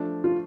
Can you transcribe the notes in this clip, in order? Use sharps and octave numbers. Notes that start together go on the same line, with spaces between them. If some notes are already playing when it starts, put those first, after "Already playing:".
Already playing: F3 A3 D4
F4